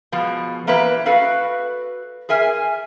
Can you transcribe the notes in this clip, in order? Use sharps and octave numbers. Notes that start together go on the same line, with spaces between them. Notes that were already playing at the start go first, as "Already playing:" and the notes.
B2 F3 G#3
E3 A#3 B3 G4 B4 E5
F#4 A4 B4 F5
G#4 A#4 E5 G#5